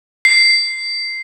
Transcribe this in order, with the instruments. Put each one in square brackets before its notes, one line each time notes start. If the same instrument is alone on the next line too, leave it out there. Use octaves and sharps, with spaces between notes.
[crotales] C7